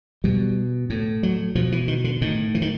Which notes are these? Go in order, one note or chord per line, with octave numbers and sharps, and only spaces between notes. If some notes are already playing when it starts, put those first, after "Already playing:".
B2 G3
A2
F#3
B2 F3
E3
D#3
D3
A2 D#3
E3
D#3